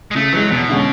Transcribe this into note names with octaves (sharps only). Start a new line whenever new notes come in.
G#3
C#3 A3
E3 F#3 G#3
E2 B2
D3 G#3 C#4